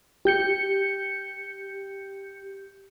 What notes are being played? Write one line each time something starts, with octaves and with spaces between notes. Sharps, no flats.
G4 G6 C#7